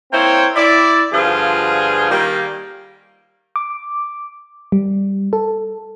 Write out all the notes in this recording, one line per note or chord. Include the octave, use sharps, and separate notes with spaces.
A#3 C4 E4 C5 C#5 G5
E4 D5
G2 D3 F3 F4 G#4
D#3 G3 A#3
D6
G3
A4